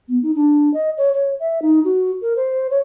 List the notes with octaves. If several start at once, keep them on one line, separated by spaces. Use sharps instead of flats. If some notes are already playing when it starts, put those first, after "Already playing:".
B3
D#4
D4
D#5
C#5
C#5
E5
D#4
F#4
A#4
C5
C#5